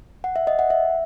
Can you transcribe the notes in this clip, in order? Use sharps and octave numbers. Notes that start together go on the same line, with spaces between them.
F#5
E5
D#5
F#5
E5